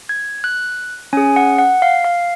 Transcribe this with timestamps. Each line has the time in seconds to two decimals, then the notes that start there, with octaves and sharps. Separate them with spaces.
0.09 G#6
0.44 F#6
1.13 C#4 G#4 G#5
1.36 F#5
1.58 F#5
1.82 F5
2.04 F5